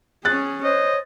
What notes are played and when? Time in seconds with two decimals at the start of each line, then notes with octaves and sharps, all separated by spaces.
0.25 C#4 G#4 F#6 A6
0.64 C5 C#5 D#5